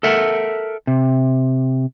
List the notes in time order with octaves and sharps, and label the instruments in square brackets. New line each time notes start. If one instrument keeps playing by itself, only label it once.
[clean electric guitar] A4 A#4 E5 F#5
C3